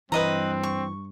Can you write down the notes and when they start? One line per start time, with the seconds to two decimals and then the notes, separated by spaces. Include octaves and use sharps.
0.12 G2 E3 C4 B4 D#5 A#5
0.63 C#6